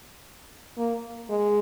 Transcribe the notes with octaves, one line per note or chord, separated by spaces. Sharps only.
A#3
G#3